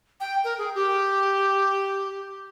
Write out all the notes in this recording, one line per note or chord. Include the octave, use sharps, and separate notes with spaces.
G5
A#4
G#4
G4